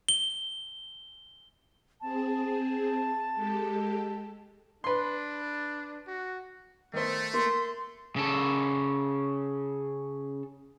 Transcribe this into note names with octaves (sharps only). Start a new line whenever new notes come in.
G7
C4 G#4 A5
G#3 G4 A4
D4 B4 C6
F#4
D#3 A3 C5
A#3 C6
C#3 A4